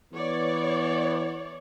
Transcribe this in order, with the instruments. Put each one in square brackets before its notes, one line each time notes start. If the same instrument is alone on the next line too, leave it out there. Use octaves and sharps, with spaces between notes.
[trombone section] E3 B3 [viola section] C#5 D5